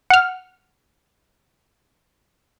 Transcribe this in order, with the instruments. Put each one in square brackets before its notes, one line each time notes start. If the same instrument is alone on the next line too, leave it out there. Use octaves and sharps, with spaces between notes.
[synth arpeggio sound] F#5 F6